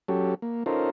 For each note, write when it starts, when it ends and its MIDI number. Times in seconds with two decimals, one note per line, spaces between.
0.08 0.35 54
0.08 0.35 61
0.08 0.35 67
0.08 0.35 69
0.42 0.64 58
0.66 0.90 61
0.66 0.90 63
0.66 0.90 65
0.66 0.90 69
0.66 0.90 70
0.66 0.90 72